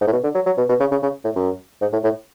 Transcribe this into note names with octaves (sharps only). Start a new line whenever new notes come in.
G#2
A2
B2
D3
F#3
F#3
B2
B2
C#3
C#3
C#3
A2
F#2
G#2
A2
A2